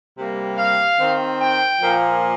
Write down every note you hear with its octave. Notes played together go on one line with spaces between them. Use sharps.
C3 G3 A#3
F5
D#3 C4
G5
A#2 F3 A#3